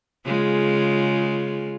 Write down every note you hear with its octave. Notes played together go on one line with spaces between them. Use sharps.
C#3 G#3 F4